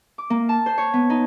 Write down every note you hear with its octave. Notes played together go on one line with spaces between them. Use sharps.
D6
A#3
A5
C5
C#5
B3
D#4